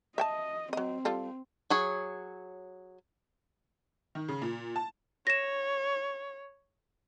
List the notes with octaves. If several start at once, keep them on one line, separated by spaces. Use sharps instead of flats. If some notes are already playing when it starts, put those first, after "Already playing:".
D#5 E5 G5 A5
F#3 C4 D#5
G3 F4 A4
F#3 G#4 C#5
D#3
C#3
A#2
A5
C#5 A#6 E7